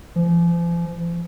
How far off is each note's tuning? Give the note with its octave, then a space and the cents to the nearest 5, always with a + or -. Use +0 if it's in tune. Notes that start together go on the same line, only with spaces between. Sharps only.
F3 -40